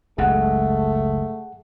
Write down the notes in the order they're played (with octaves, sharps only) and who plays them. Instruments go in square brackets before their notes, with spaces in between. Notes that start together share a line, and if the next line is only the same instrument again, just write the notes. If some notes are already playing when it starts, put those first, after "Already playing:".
[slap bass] F#1 C#2 G#2 [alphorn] A3 [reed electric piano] G#4 F#5